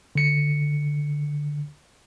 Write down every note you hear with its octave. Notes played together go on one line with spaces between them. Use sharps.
D3 C#7